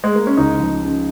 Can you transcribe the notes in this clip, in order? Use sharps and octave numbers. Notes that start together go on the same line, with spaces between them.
G#3
A#3
C#4
C#2 D#4
F3
C#3